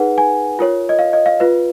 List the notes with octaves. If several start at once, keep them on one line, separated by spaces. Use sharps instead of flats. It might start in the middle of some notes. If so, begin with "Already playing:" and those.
Already playing: D#4 G#4 B4 F#5
G#5
F4 A#4 C#5
D#5
F5
D#5
F5
F4 B4